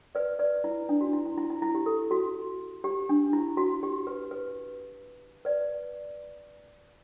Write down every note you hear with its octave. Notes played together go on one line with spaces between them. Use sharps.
B4 D5
B4 D5
E4
D4
F#4
E4
E4
E4
E4
E4
G4
A4
F#4
G4
D4
E4
F#4
G4
B4
B4
B4 D5